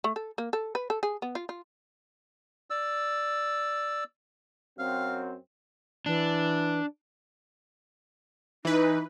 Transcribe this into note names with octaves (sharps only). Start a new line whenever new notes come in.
A3
A4
A#3
A4
B4
A4
G#4
B3
F4
F4
D5 E6
F#2 C4 F5
E3 D4
E3 D#4 B4